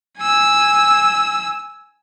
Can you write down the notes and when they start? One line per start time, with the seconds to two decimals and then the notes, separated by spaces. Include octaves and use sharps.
0.18 G#5 E6